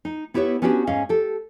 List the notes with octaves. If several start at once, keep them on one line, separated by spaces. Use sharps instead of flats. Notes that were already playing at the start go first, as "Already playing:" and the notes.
D#4
B3 E4 G4 B4 C#5
B3 C#4 D4 F#4 G4 B4
G#2 C#4 G#4 D#5 F5
G4 A4